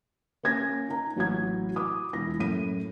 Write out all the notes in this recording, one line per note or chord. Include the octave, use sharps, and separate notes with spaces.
A#3 C#4 G#6 A#6
D#4 A#5
A1 F#3 E4 G#6
D6 D#6
E1 E4 A#6
F#2 A2 D#7